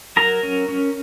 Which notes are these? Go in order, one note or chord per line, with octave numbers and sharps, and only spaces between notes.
F#3 A#4 A#5
C#4
C#4